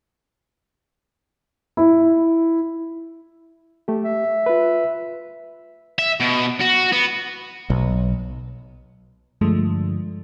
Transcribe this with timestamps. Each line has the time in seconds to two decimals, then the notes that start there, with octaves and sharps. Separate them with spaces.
1.77 E4
3.88 A3 G4
4.04 E5
4.46 F4 B4
5.99 E5
6.20 B2
6.60 F#4
6.92 B3
7.70 B1
9.41 G2 D3 F3 G#3 A3 D4